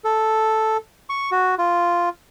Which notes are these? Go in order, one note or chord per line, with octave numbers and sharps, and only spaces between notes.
A4
C#6
F#4
F4